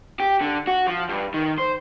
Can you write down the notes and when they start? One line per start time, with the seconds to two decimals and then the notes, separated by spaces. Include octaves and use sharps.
0.20 G4
0.41 D3
0.67 F#4
0.87 F3
1.09 G2
1.34 D#3
1.58 C5